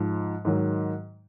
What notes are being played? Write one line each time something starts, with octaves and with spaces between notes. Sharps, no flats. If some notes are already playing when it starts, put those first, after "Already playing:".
Already playing: G#2 F3
G#2 D#3 F#3